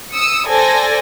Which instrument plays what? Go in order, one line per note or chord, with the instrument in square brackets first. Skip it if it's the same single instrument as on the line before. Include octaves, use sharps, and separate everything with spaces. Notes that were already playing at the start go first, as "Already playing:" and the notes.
[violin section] D#6 E6 C#7
A4 C5 D5 G#5 A#6